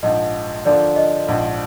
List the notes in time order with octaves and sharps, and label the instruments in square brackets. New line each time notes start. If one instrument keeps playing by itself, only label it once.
[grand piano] A#1 G#2 F3 [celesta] D#5
[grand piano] D3 F3 A#3 F4 [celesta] D5
[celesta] D#5
[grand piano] A#1 G#2 F3